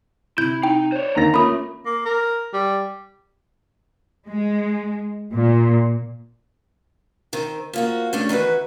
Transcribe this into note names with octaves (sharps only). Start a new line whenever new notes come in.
C3 E4 G6
D#4 G5
C5 C#5
D#2 D#3 A#5 A#6
A3 A#3 C#4 F4 B5 D#6
A#3
A#4
G3
G#3
A#2
D#3 C4
F3 A#3 F#4
A3 C#4 D4 G4
D#3 E3 F#4 B4